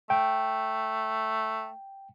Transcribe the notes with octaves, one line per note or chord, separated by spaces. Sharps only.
A3 G5